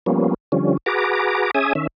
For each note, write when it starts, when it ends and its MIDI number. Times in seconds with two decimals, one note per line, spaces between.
0.06 0.34 53
0.06 0.34 55
0.06 0.34 58
0.06 0.34 59
0.06 0.34 61
0.52 0.77 50
0.52 0.77 53
0.52 0.77 55
0.52 0.77 61
0.86 1.51 66
0.86 1.51 68
0.86 1.51 71
0.86 1.51 82
0.86 1.51 86
1.55 1.73 61
1.55 1.73 68
1.55 1.73 76
1.55 1.73 80
1.55 1.73 87
1.75 1.87 51
1.75 1.87 61
1.75 1.87 76